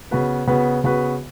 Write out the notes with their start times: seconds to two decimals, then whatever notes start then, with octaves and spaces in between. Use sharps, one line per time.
0.11 C#3 B3 F#4 B4
0.47 C#3 B3 F#4 B4
0.84 C#3 B3 F#4 B4